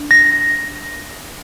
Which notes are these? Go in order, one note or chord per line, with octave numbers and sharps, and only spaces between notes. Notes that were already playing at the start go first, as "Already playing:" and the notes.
Already playing: D4
A#6